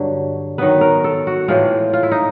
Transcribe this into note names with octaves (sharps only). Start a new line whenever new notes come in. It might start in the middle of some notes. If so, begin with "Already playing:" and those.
Already playing: G2 D3 F#3
D#3 F#3 B3 B4
A#4
A4
F#4
A2 E3 G#3 F4
F4
E4
D#4